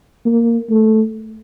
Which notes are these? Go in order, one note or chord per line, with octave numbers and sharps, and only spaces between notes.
A#3
A3